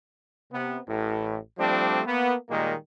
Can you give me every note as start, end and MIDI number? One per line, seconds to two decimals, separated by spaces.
0.52 0.79 48
0.52 0.79 59
0.88 1.37 33
0.88 1.37 45
1.58 2.01 53
1.58 2.01 55
1.58 2.01 57
1.58 2.01 60
1.58 2.01 62
2.05 2.34 58
2.05 2.34 59
2.49 2.74 46
2.49 2.74 51
2.49 2.74 55
2.49 2.74 56
2.49 2.74 58